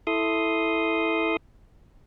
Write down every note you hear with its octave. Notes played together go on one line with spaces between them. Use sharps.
E4 A4 C6 D#6